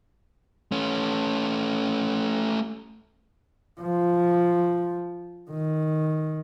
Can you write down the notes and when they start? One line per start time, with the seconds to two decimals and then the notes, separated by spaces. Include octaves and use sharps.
0.72 A3 C#4
3.80 F3
5.51 D#3